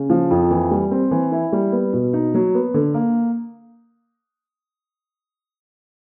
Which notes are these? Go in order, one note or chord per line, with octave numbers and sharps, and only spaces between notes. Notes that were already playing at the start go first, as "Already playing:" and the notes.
Already playing: C#3
F3
F2
E3
G3
C4
E3
E4
G3
B3
B2
D#4
F#3
B3
D3
A#3